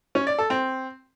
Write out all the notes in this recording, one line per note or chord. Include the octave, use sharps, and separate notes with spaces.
C#4
D5
A4
C4